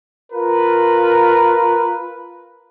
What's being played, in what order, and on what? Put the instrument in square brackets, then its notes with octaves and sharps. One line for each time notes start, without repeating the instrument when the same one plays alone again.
[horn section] F4 A#4 B4